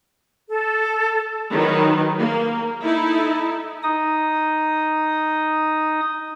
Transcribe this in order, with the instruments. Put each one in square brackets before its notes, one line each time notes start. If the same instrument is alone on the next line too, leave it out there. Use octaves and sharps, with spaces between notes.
[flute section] A4
[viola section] D#3 F#3 B4
A#3
D#4 E4 A4
[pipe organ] D#4 D#6